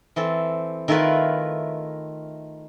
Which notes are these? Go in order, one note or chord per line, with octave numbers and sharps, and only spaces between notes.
E3 C4 A4
D#3 A3 E4 F4 A#4 B4